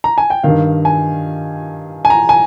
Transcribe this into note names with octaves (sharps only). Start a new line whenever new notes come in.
A#5
G#5
G5
G2 D#3 F5
G#5
G#5
A#5
G#5